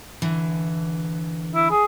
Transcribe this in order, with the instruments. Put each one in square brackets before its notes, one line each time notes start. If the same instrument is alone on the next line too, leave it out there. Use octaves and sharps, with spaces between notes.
[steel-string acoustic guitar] D3 E3
[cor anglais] E4
G#4